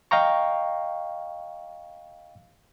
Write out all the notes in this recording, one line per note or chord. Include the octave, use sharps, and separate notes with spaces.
D#5 F5 G5 A#5 C#6